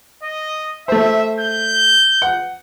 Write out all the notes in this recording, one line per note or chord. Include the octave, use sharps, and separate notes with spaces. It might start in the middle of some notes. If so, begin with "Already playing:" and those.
D#5
A3 C5 E5
G6
F#5